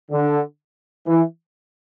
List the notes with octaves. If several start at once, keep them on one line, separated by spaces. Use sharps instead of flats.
D3
E3